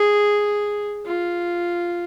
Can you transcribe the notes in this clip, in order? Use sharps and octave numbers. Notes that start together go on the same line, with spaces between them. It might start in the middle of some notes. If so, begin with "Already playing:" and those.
Already playing: G#4
F4